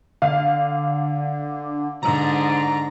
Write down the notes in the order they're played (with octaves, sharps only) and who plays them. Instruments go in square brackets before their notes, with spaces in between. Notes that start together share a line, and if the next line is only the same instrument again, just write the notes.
[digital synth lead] D3 [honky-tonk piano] F5
[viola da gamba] G#2 D3 [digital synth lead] A#5